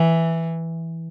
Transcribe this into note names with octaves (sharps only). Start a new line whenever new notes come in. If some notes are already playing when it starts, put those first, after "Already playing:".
Already playing: E3